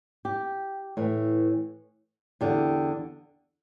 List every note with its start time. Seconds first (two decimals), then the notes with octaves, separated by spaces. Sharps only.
0.25 G4
0.97 A2 E3
2.41 E2 D3 G4